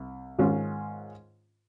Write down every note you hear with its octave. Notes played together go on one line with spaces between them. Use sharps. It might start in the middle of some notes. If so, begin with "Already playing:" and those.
Already playing: C2
G#2 D#3 G#3 C#4 F4